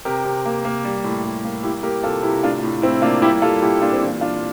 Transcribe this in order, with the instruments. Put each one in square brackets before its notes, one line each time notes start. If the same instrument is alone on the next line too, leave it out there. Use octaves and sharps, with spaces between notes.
[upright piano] C3 G4 A#4
C3
A#3
A#3
G3
A2
G3
A#3
G3 E4 G4
A#3 G4 A#4
C3 F4 A4
C3 E4 G4
A2 D4 F4
A2
A2 C4 E4
A#3 D4 F4
G3 E4 G4
G3 F4 A4
A#2 E4 G4
A#2 D4 F4
C4
E3 D4
E3 D4 F4